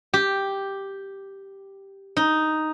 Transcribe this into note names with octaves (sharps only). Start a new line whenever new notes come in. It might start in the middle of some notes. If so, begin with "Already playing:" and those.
G4
D#4